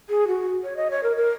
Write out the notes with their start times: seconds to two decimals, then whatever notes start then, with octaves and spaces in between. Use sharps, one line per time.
0.09 G#4
0.27 F#4
0.64 C#5
0.77 D#5
0.91 C#5
1.03 A#4
1.17 A#4